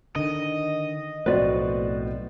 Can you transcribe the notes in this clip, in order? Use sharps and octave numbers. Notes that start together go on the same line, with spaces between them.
D3 D#3 D#5
B1 F2 A2 F#4 B4 C5 D5